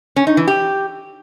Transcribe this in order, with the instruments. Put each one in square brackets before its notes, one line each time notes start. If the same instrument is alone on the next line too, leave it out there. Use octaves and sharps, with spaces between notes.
[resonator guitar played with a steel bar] C#4
D#4
E3
G4